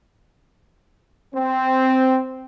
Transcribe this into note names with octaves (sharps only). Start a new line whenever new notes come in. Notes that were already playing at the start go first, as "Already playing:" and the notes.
C4